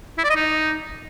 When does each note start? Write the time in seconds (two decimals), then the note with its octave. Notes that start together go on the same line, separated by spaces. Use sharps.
0.18 E4
0.24 D5
0.30 D#5
0.36 D#4